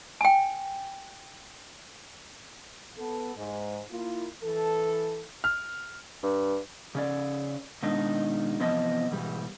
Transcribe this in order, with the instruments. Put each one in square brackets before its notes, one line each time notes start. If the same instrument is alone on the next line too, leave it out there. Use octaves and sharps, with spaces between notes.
[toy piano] G5 G#5
[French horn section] B3 A4
G#2
A#3 E4 F4
E3 A4
[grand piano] F6
[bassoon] G2
[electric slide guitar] C#3 C#4 D5
B2 D#3 G#3 D4 D#4
C3 E3 F3 B3 D#5 A5
G#2 B2 E3 G3